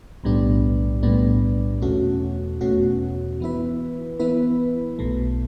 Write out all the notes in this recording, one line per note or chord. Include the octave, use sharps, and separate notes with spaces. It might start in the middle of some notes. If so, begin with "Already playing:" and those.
B1 A2 G3 B3 D4
B1 A2 G3 B3 D4
E2 B2 A3 C#4 F#4
E2 B2 A3 C#4 F#4
E3 B3 E4 B4
E3 B3 E4 B4
B1 B2 A3